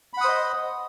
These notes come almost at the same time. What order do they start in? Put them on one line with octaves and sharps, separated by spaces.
B5 F#5 D#6 C5 D#5